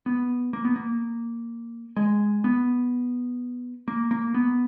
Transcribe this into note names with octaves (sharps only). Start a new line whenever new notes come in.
B3
A#3
B3
A#3
G#3
B3
A#3
A#3
B3